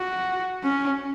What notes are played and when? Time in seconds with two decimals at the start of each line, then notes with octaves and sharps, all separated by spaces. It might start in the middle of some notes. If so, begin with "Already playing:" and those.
Already playing: F#4
0.63 C#4